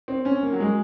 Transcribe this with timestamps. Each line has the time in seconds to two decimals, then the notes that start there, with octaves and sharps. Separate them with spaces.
0.08 C4
0.25 C#4
0.43 A#3
0.52 F#3
0.60 G#3